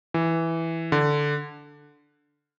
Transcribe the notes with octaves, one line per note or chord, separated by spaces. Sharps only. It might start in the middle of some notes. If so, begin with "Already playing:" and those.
E3
D3